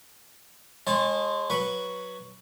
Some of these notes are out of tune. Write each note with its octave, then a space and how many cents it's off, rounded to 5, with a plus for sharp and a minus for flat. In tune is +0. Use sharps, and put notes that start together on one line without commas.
G#3 -10 C#5 -45 A5 -15
F#3 +0 B4 -5 C#6 +0